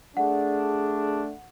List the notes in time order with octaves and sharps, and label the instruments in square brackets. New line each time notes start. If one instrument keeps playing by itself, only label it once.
[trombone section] A3 D4 [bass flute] G#4 [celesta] F#5